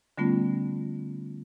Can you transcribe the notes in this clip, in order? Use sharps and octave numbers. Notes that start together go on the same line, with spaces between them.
D3 G3 A3 B3 C#4 F4